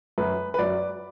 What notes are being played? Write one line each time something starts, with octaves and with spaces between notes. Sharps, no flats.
F#2 F#3 B4
B4
F#2 F#3 D5